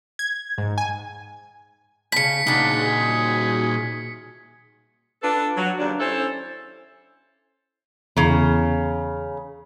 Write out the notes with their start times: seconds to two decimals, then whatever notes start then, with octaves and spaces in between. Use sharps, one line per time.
0.19 G#6
0.58 G#2
0.78 G#5
2.12 A2 C#3 B6 C#7
2.47 A#2 C#3 D4 D#4 F#4
2.82 G#4
5.23 D4 F4 A4 B4
5.56 F#3
5.79 D#2 C#3 D4
6.00 C#4 E4 A4 C5
8.17 E2 C#3 A#5